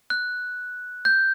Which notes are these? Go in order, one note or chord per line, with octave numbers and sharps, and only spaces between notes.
F#6
G6